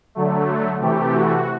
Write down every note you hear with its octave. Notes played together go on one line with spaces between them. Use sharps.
D3 F#3 A3
C3 E3 A3 G4
F#4